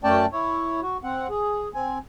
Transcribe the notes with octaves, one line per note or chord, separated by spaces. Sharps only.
F#2 A3 C#4 D5 G5 A5
E4 C#5
F#4
C4 F#5
G#4
C4 G#5